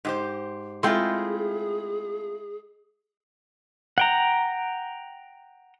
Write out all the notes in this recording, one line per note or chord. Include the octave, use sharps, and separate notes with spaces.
G#2 G4 C5
G#3 A3 C4 E4 F4 G#4 G5 C6
F#5 G5 A#5